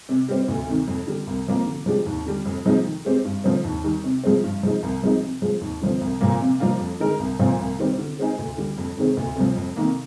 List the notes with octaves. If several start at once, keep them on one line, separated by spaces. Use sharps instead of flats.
C3
G3 C4
D2
C3 D#3
F2
D3 G3
C2
C3 F3 A#3
D3
F3 G#3 D4 G4
D#2
D3 G3
F2
C3 F3 G#3 D#4
D#3
G#3 C4 G4
G2
D3 F3 C4
D#2
D#3 G3
C3
F3 G#3 C4
G2
F3 G#3 D#4
C2
C3 F3 G#3 D#4
C3
F3 G#3
D#2
D3 F3 C4
C2
A#2 F3 A#3
C3
F3 A#3 D4 F4
F2
D3 G#3 D#4 A#4
C2
A#2 F3 C4
C2
C3 D#3 G3 C4
D3
G#3 C4 D#4 G#4
D2
D3 G3
F2
C3 D#3 G#3 C4
D2
C3 F3
F2
C3 D#3 A#3